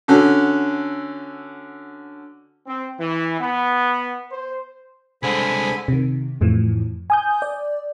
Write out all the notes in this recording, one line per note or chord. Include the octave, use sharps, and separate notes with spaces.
D3 C#4 F#4 A4
C4
E3
B3
C5
C2 D3 G#3 C5 G#5 B5
C3 D#3
F2 A2 E3 F3
G#5 D#6 G6
D5